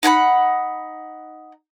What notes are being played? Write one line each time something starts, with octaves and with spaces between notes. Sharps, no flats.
D#4 F#5 G#5 B5